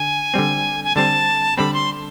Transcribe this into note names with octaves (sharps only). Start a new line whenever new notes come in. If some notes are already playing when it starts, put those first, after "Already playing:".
Already playing: D3 G#5
D3 G3 C4
G#5
D3 G3 C4 A5
D3 G3 C4 B5
C6